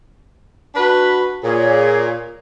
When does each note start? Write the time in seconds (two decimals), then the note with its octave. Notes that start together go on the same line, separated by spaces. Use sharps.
0.75 D4 F#4 B4
1.43 A#2 G#4 C#5